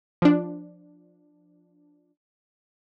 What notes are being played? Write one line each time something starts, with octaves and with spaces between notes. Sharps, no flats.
F3 D4